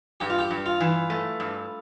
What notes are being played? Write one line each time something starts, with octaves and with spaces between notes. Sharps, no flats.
G2 G4
F4
G4
G2
F4
E3
A3
G2